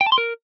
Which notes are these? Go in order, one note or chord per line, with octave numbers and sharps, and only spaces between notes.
G5
A5
C6
A#4